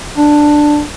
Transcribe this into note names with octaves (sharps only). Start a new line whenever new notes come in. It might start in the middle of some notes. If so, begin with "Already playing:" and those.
D4